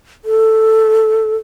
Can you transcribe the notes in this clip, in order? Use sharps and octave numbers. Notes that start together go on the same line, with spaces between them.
A4